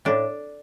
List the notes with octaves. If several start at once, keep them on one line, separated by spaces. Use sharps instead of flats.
A2 D4